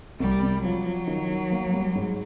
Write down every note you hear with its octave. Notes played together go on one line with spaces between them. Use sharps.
C2 G3
C3
F3 F#3
F3
D#3
D#3
A#3
G3
G#2